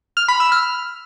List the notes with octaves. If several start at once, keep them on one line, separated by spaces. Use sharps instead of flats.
F6
B5
E6
F6